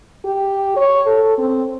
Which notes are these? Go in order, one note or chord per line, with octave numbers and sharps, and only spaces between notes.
G4
C#5
A4
C4